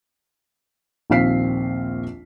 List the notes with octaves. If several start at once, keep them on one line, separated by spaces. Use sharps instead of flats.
A#1 D#2 C4 F5 B6 C7